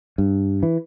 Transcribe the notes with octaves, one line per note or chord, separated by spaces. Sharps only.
G2
E3